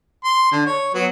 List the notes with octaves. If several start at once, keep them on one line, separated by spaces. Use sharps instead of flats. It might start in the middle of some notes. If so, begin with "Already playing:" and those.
C6
D3
C#5
F#3 B3